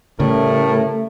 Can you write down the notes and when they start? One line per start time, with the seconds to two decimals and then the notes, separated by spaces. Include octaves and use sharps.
0.20 A2 C#3 G3 A3 A#4